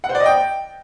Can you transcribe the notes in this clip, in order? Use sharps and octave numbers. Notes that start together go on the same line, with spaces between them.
F#5
C5
D5
D#5
G5